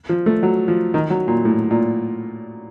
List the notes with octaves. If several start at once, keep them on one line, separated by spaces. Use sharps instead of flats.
F3
A3
F#3
F3
D#3
F#3
A#2
A2
A#2